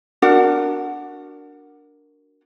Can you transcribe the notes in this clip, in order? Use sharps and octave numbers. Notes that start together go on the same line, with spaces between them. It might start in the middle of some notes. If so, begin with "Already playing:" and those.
D4 F#4 A#4 F#5